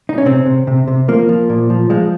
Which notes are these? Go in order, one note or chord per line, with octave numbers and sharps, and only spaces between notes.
D#4
C#4
C3 C4
C3
C3
C3
F3 A#3
F3
A#2
F3
F3 G#3